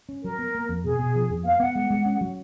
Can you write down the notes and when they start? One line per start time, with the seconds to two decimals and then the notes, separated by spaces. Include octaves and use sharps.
0.09 C#4
0.24 F#3 A#4
0.39 B3
0.55 A#3
0.69 F2
0.85 B2 G#4
0.99 B2
1.15 F3
1.30 F2
1.45 B3 F5
1.60 B3 F#5
1.75 G#3
1.90 G#3
2.06 C#4
2.21 F#3